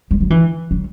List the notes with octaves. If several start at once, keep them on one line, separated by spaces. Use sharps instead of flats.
G3
F#3
E3
F#3